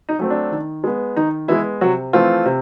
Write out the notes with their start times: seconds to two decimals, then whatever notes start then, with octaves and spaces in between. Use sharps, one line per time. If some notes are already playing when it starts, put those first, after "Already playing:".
0.09 D#4
0.19 F#3 A3 C4
0.30 D4
0.52 D#3
0.84 G#3 B3
1.16 D#3 D#4
1.48 E3 G#3 B3 E4
1.81 C3 F#3 F#4
2.13 E3 F3 A3 C4 F4
2.45 C3